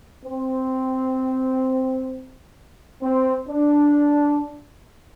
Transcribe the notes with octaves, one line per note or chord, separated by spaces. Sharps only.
C4
C4
D4